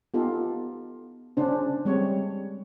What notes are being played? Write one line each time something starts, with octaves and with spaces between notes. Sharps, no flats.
B3 D#4 F4 G4 A4
C#3 C#4 D4 C5
G3 G#3 C4 C#5